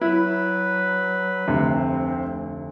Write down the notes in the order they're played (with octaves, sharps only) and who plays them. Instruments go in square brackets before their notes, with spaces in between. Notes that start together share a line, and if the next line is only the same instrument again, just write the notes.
[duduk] F#3 [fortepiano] E4 [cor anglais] B4
[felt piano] F1 D2 [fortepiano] C3 [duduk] C4